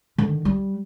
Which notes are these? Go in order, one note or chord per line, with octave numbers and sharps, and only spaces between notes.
D3 D#3
G3